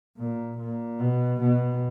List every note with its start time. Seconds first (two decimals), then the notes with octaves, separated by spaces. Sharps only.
0.17 A#2
0.58 A#2
0.99 B2
1.41 B2